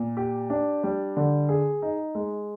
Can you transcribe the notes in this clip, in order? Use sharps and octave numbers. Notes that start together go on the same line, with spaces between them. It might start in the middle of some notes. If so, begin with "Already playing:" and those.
Already playing: A#2
G4
D4
G3
D3
G#4
D#4
G#3